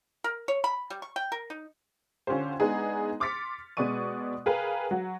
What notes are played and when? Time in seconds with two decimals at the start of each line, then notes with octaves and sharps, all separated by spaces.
0.24 A#4
0.48 C#5
0.64 B5
0.90 G3
1.02 C#6
1.16 G5
1.32 A#4
1.50 D#4
2.27 D3 C#4 F4 G4 C5
2.60 G#3 B3 D4 D#4 G#4
3.20 C6 D6 F6 A6 B6 C#7
3.77 B2 G#3 B3 D5 C#6 D#7
4.46 G#4 A#4 B4 F5 G5
4.91 F#3 F#4